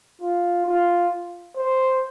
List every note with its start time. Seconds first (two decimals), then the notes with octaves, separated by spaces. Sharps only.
0.22 F4
0.66 F4
1.56 C5